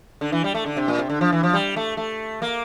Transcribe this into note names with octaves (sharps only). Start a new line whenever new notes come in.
D3
E3
G3
A3
D3
C3
A#2
C3
D3
F3
E3
F3
G3
A3
A3
A#3